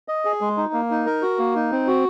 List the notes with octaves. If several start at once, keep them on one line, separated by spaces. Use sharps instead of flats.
D#5
G#4
G#3
D#4
A#3
D#4
A#4
F#4
A#3
D#4
C4
F#4